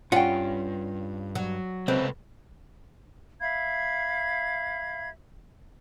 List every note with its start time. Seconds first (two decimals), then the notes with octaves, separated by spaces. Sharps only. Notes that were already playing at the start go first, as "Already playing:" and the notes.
0.12 G2 C#4 F4 F#5 G5
1.35 F#3
1.88 C#2 C3 C4 A4 B4
3.40 E5 F5 B5 G#6